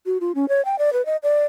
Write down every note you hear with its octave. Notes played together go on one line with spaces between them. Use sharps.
F#4
F4
C#4
C#5
G5
D5
B4
D#5
D5